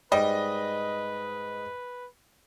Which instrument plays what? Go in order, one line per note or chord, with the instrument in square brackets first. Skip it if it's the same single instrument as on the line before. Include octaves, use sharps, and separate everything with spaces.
[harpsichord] G#2 [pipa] G3 [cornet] B4 [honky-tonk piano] D#5